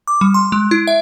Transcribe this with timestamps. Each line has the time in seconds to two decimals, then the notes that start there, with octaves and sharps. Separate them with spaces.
0.07 D6
0.21 G3
0.34 C6
0.52 G#3
0.71 E4
0.87 E5